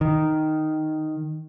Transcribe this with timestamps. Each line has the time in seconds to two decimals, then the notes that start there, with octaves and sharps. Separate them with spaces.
0.01 D#3